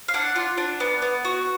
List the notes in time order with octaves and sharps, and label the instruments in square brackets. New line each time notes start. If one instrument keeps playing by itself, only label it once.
[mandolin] F5
D4 F#5
F4
D4
B3
B3
F#4